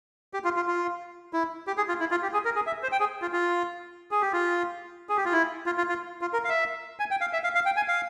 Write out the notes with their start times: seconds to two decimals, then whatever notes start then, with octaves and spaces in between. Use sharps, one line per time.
0.34 G4
0.44 F4
0.56 F4
0.67 F4
1.33 E4
1.67 G4
1.77 G#4
1.88 F4
2.00 E4
2.11 F4
2.23 G4
2.33 G#4
2.45 A#4
2.56 G#4
2.67 E5
2.83 C5
2.92 G5
3.00 G#4
3.22 F4
3.33 F4
4.11 G#4
4.22 G4
4.33 F4
5.09 G#4
5.17 G4
5.25 F4
5.33 E4
5.66 F4
5.78 F4
5.89 F4
6.21 F4
6.33 A#4
6.44 F5
6.49 E5
7.00 G#5
7.11 G5
7.21 F5
7.33 E5
7.44 F5
7.55 F5
7.66 G5
7.77 G#5
7.88 F5